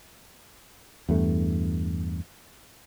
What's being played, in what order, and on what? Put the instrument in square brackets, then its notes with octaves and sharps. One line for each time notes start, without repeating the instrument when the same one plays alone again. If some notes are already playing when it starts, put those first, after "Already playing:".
[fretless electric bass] E2 G2 A3